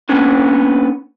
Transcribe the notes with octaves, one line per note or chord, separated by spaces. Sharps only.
A#3 B3 C#4 D4